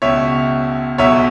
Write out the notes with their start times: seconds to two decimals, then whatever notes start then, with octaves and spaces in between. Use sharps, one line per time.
0.02 C#2 B2 C#5 E5
0.98 B1 B2 C#5 E5